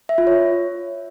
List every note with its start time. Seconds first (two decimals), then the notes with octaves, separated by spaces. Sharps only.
0.09 E5
0.18 F4
0.27 C#5